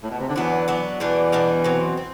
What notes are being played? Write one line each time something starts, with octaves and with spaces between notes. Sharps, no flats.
A2
B2
C3
D3
E2 E3 F#3 B3 D4
F#3 B3 D4
E2 B2 E3 G3 D4
B2 G3 D4
B2 F#3 C4
C4